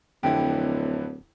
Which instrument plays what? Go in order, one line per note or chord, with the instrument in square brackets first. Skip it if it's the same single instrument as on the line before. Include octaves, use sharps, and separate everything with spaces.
[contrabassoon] D1 [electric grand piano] F2 D3 E4 [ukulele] G4